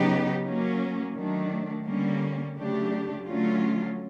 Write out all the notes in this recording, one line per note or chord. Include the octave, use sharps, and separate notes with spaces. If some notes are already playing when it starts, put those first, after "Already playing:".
Already playing: C#3 F#3 B3 D#4 G4
F#3 A#3 C#4
D#3 F#3 A3 D4
D3 G3 A#3 C#4
C#3 F#3 A3 D4 G4
D3 F#3 A3 C#4 F4